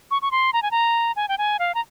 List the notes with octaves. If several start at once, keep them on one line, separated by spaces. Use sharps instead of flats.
C#6
C#6
C6
A#5
G#5
A#5
G#5
G5
G#5
F5
A#5